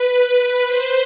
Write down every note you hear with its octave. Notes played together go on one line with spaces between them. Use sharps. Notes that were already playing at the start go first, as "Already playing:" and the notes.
Already playing: B4
B4
C5